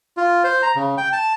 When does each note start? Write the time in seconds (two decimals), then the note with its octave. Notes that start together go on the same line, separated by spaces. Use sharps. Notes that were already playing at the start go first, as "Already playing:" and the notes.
0.17 F4
0.44 C5
0.62 A#5
0.76 C#3
0.98 G5
1.13 A5